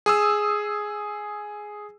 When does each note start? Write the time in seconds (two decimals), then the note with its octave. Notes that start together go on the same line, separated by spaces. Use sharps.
0.06 G#4 D#6 E6